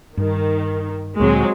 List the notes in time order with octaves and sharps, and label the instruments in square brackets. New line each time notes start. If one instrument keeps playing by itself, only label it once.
[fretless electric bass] G2 [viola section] D#3
[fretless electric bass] D2 A#2 [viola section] F#3 G#3 C4